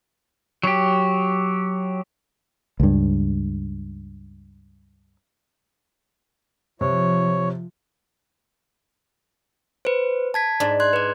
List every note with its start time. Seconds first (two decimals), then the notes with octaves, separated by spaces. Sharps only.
0.63 F#3 G4
2.80 C#2 G2
6.81 C3 F3 C#5
9.85 B4 C5
10.34 A5 G#6 B6
10.60 G#2 D4
10.80 C6 F#6 G#6
10.93 B4 D5